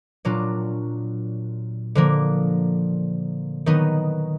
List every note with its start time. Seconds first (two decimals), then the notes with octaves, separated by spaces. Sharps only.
0.25 A#2 F#3 D4 F4
1.95 D3 F3 A#3
3.66 D#3 F#3 B3 D#4